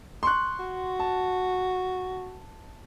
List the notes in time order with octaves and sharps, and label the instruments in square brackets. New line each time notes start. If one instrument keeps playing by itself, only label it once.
[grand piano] C6 C#6 F#6
[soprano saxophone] F#4
[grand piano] A5